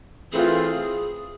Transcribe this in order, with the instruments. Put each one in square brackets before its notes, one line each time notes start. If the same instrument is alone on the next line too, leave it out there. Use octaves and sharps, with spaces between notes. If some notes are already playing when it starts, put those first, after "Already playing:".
[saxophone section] E3 A3 C4 F4 [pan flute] G#4